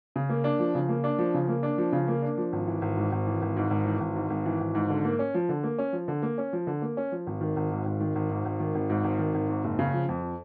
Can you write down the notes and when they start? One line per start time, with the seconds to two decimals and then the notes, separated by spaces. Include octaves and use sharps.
0.16 C#3
0.29 A#3
0.44 D4
0.59 F3
0.75 C#3
0.89 A#3
1.04 D4
1.18 F3
1.34 C#3
1.48 A#3
1.63 D4
1.78 F3
1.92 C#3
2.08 A#3
2.22 D4
2.38 F3
2.52 G#1
2.67 E3
2.82 G#1
2.97 G#2
3.12 G#1
3.27 E3
3.42 G#1
3.57 G#2
3.71 G#1
3.85 E3
4.00 G#1
4.15 G#2
4.30 G#1
4.45 E3
4.60 G#1
4.75 G#2
4.90 D3
5.05 A#3
5.19 C#4
5.34 F3
5.49 D3
5.63 A#3
5.78 C#4
5.93 F3
6.08 D3
6.22 A#3
6.38 C#4
6.53 F3
6.67 D3
6.82 A#3
6.97 C#4
7.12 F3
7.27 G#1
7.41 D#3
7.56 G#1
7.71 G#2
7.85 G#1
8.00 D#3
8.15 G#1
8.30 G#2
8.45 G#1
8.60 D#3
8.75 G#1
8.90 G#2
9.04 G#1
9.19 D#3
9.34 G#1
9.49 G#2
9.64 F#1
9.79 C#3
9.94 F3
10.09 F2